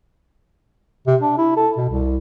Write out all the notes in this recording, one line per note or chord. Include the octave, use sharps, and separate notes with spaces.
C3
D4
E4
A4
B2
C2